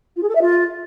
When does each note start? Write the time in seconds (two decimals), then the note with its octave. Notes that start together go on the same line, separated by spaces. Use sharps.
0.16 F4
0.22 G#4
0.29 A4
0.35 E5
0.41 F4